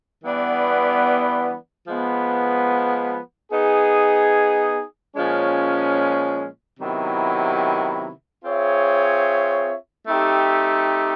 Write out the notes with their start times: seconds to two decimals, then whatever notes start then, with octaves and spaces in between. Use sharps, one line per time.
0.24 E3 G3 B3 D4
1.88 F3 G#3 B3
3.52 B3 D#4 G#4
5.16 A#2 F3 G#3 C#4
6.80 C3 D#3 F#3 B3 E4
8.44 C4 F4 G#4 C#5 E5
10.08 A3 C4 D#4 G4